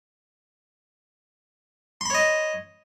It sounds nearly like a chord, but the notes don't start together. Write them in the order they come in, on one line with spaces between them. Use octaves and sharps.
C6 B5 C#5 D#5